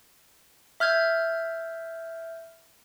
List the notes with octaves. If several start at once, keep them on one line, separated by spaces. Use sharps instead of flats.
E5 F6 G6 G#6